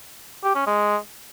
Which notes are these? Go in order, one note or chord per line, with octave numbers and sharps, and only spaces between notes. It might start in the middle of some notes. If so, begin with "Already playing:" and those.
G4
C#4
G#3